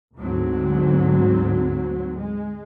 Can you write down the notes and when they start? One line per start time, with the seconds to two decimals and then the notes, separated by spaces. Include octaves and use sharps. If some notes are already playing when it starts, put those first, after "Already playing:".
0.16 D2 G#2 D3 F#3 C4
2.15 G#3